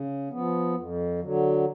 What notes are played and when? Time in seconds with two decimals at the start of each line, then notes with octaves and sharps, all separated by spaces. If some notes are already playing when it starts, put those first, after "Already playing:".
Already playing: C#3
0.30 F3 B3
0.75 F2
1.20 D3 F#3